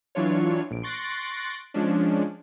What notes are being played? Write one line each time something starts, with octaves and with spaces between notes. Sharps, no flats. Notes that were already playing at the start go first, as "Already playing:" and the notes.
E3 F#3 D4 F4 C#5
A#1 D7
C6 C#6 F#6 A6 A#6 D7
F3 G#3 C#4 D4